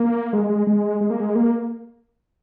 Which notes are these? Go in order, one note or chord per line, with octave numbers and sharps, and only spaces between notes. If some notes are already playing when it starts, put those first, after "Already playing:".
Already playing: A#3
G#3
G#3
G#3
G#3
A#3
G#3
A#3